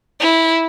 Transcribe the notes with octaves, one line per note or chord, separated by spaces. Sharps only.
E4